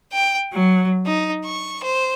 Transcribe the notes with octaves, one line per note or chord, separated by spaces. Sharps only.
G5
F#3
D#4
C#6
C5